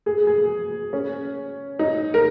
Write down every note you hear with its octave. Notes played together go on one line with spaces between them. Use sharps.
G#4
G#4
C#4
D#4
A#4